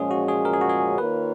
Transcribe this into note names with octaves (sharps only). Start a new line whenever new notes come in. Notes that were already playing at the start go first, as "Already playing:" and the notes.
Already playing: A#2 F3 G#3 C#4 G#4
F#4
G#4
A#4
G#4
F#4
G#4
D#3 A#3 F4 A#4 B4 C#5